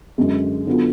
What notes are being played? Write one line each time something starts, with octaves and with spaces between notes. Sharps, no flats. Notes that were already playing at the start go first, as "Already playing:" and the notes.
F#2 D3 G#3
D3 F#3 B3 F4